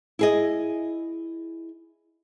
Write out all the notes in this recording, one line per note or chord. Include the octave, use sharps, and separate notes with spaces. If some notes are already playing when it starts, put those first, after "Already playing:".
E4 G#4 D#5